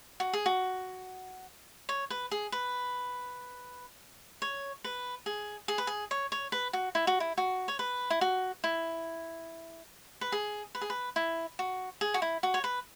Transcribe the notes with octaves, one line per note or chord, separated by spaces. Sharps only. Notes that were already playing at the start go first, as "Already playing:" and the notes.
F#4
G#4
F#4
C#5
B4
G#4
B4
C#5
B4
G#4
G#4
B4
G#4
C#5
C#5
B4
F#4
E4
F#4
E4
F#4
C#5
B4
E4
F#4
E4
B4
G#4
B4
G#4
B4
E4
F#4
G#4
F#4
E4
F#4
C#5
B4